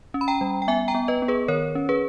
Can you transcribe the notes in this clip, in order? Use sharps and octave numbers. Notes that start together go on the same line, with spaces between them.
C#4
B5
G5 A#5
G3
G5
B3 E5 G#5
G5 A#5
B3
B4 D#5
B3
G#4 B4
D#3 A#4 C#5
C#4
G#4 B4